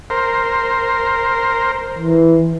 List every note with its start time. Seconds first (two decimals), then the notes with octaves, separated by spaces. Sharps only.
0.10 A#4 C5
1.99 E3